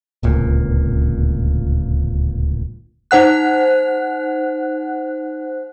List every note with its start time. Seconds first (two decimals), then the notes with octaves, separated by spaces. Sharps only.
0.23 D1 C#2 A#2
3.11 D#4 C5 F#5 F#6